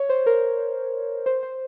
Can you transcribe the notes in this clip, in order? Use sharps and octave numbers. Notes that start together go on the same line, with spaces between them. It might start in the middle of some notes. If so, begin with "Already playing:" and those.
Already playing: C#5
C5
A#4
C5
C5